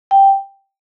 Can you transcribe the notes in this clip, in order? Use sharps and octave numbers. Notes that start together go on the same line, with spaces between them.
G5